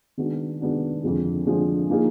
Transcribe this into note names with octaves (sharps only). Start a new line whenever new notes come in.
D#3 G#3 B3 D4 F#4
D#3 G#3 B3 D4 F#4
F2 D3 F3 G#3
F2 D3 F3 G#3
F3 A#3 D#4 G#4